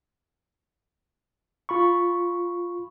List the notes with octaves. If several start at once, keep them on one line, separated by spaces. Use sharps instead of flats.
F4 B5 C#6